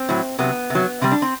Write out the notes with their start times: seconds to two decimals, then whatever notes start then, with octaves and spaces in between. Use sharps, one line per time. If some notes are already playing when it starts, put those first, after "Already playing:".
Already playing: C4
0.09 A2 F#3
0.39 C3 F#3 B3
0.70 C3
0.75 F#3
1.01 C3 G3 C4
1.12 D4
1.22 C4